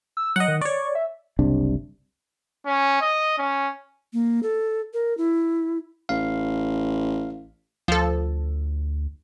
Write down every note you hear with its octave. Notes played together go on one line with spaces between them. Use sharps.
E6
F#3 D#5 F#5
D#3
C#5 D5 C#6
E5
F#1 C2 C3 D4
C#4
D#5
C#4
A#3
A4
A#4
E4
A1 F5
D2 F3 A4